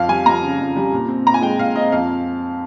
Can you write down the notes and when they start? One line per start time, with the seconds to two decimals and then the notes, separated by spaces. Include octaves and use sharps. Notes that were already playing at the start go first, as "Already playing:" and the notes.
Already playing: F2 F5
0.08 G3 G#5
0.26 F2 A#5
0.43 C#3
0.59 F2
0.76 G3
0.93 A#2
1.08 C4
1.25 A#2 A#5
1.34 G#5
1.42 G#3 G5
1.58 A#2 F5
1.76 C4 D#5
1.92 F2 F5